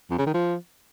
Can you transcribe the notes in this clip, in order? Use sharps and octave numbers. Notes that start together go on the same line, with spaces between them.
F2
C#3
D#3
F3